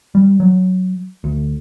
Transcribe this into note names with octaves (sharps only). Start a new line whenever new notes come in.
G3
F#3
D2